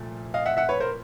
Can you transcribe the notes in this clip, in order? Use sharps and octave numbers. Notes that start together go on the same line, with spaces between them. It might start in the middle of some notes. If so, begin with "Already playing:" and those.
Already playing: C2 A#2 F3 A3
D#5 F5
E5 F#5
E5 F#5
B4 C#5
A#4 C5